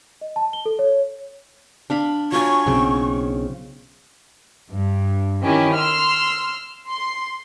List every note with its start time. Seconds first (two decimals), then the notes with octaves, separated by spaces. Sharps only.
0.21 D#5
0.36 A5
0.53 G7
0.66 A4
0.79 C#5
1.90 D4 F5 B5
2.32 F#3 F4 G#5 C#6
2.67 B1 C#3 C4
4.72 G2
5.43 D#3 C#4 E4 G4
5.76 C6 E6 F6
6.89 C6